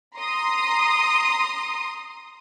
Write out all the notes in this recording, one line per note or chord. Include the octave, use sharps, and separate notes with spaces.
A#5 C6 D#6